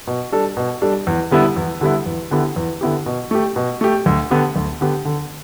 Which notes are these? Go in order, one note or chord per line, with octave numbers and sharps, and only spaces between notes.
B2
G3 D4 A4
B2
G3 D4 A4
E2
D3 G3 B3 E4
E2
D3 G3 B3 E4
E2
D3 B3 E4 G4
E2
D3 B3 E4 G4
B2
A3 G4
B2
A3 G4
D2
D3 B3 G4
D2
D3 B3 G4
D3